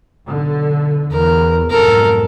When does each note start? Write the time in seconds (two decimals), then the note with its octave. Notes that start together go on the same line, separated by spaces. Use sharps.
0.26 B1 D3
1.10 E2 A#4
1.70 B1 F2 G#2 A4 A#4